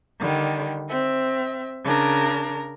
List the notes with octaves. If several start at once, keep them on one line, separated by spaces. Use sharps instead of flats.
D3 D#3 G3
C4 E5
C#3 D4 A#4 A#5